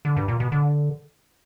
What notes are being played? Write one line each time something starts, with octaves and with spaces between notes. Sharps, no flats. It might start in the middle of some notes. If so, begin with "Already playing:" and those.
D3
G2
A#2
B2
D3